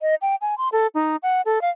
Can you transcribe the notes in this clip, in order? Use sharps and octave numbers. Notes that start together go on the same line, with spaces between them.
D#5
G5
G#5
C6
A4
D#4
F#5
A4
F5